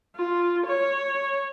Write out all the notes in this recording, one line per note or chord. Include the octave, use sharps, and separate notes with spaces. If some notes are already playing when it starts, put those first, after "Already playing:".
F4
C#5